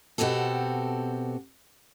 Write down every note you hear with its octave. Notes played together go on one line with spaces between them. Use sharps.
B2 C4 F#4 G4 A4